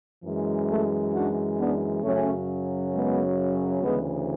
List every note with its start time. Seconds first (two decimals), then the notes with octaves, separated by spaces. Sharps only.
0.24 F#2 E3 G#3
0.68 A3
1.13 D4 F#4
1.58 B3 D4
2.03 F#2 C#3 F#3 A3 C#4
2.93 G#3 B3
3.82 D2 C#3 E3 G#3 B3